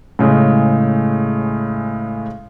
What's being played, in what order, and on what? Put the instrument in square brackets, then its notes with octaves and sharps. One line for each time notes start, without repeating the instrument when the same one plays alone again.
[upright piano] A2 C#3 G#3